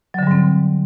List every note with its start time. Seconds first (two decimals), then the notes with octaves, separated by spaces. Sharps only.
0.14 F#3
0.18 D3
0.23 G3
0.27 G#2
0.31 C4